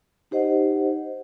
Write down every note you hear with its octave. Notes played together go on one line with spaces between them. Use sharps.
D#4 G4 C5 D#5 F#5